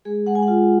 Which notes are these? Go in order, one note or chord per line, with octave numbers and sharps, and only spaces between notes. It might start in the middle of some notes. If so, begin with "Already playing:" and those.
G#3 G#4
G#3 F#5
G#5
F#5
F4